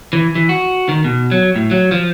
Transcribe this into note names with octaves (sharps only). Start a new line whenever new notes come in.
E3
E3
F#4
D#3
B2
F#3
A2
F#3
F3